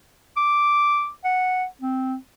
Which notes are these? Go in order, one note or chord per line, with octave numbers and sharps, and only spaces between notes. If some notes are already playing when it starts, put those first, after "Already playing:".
D6
F#5
C4